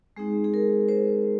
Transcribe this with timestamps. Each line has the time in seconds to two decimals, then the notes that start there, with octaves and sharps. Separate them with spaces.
0.16 G#3 C4 D#4 G#4
0.44 G#4
0.54 A#4
0.89 C5